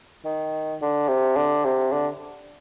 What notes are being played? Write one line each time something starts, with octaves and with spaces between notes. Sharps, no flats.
D#3
D3
C3
D3
C3
D3